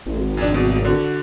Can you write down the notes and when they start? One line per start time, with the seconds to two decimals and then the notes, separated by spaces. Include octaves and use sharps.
0.06 A1
0.17 G#1
0.37 F2 D4
0.54 C2 B2
0.85 D3 F#4